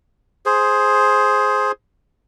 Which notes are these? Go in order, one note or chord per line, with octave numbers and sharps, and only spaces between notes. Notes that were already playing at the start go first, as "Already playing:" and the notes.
G#4 C5